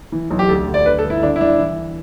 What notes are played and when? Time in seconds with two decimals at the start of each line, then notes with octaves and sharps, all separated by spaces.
0.12 E3
0.31 B1
0.39 G4
0.49 D2 A4
0.68 D3
0.74 D5
0.86 D3 B4
0.98 A4
1.04 G1
1.10 E4
1.23 D3 D4
1.36 E4
1.41 G1 D4
1.59 E3